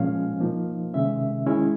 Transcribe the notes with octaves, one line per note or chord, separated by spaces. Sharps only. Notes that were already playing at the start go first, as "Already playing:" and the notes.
Already playing: A#2 F3 G#3 C#4 F5
F3 A#3 D#4
C3 D#3 G#3 C#4 E5
D#3 G#3 C#4 E4